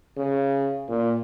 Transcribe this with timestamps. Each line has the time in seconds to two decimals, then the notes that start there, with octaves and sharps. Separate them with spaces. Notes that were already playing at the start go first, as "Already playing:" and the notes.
0.18 C#3
0.89 A#2